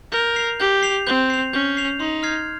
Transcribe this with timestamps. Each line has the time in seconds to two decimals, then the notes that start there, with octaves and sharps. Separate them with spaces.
0.12 A#4 G6
0.36 C7 F7
0.60 G4 G6
0.83 C7 F7
1.07 C4 G6
1.30 C7 F7
1.53 C#4 G6
1.77 C7 F7
2.00 D#4 C6
2.23 F6 G#6 C7